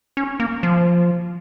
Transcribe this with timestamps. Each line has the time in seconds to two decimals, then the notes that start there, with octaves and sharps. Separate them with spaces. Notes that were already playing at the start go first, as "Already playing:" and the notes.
0.17 C#4
0.40 A#3
0.63 F3